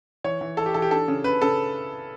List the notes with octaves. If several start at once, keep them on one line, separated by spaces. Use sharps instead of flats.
E3 C#5
E3
E3 A4
G4
E3 A4
G4
D4 A4
C#3
C#3 B4
C#3 A4